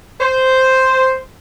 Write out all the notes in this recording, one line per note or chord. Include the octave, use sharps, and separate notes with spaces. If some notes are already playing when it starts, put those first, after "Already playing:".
C5